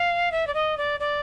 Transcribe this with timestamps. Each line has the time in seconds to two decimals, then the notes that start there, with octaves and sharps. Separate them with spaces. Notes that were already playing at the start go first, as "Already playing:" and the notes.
Already playing: F5
0.31 E5
0.47 D5
0.54 D#5
0.77 D5
1.00 D5